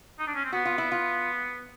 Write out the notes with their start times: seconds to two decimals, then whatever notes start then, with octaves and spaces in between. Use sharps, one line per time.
0.19 D#4
0.27 D4
0.35 C#4
0.44 C4
0.52 B3 F#4
0.65 F4
0.78 E4
0.92 F4